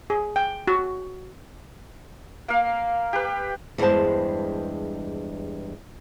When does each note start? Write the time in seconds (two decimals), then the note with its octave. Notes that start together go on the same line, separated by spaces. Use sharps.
0.10 G#4
0.36 G5
0.67 F#4
2.48 A#3 F5
3.13 G4 B4
3.78 E2 G2 G3 G#3 C5 A5